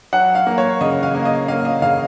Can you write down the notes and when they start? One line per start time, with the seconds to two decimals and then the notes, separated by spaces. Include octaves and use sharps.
0.13 F#3 F#5
0.35 F5
0.47 A#3
0.58 C#5
0.81 C#3 D#5
1.03 F5
1.15 A#3
1.25 D#5
1.48 A#3 F5
1.65 D#5
1.82 C#3 F5